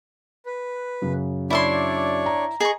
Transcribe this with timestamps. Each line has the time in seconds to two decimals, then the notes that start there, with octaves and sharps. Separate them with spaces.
0.46 B4
1.02 F#2 C#3
1.50 D4 E4 C#5 D5 E5 C6
2.26 A#5
2.60 G#4 D#5 A5 C#6